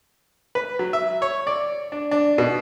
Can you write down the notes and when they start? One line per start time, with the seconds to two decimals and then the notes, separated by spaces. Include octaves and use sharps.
0.55 B4
0.79 F#3
0.93 E5
1.22 C#5
1.47 D5
1.92 D4
2.11 D4
2.38 B2